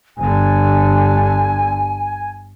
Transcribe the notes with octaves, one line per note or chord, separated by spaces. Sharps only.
G1 D3 G#5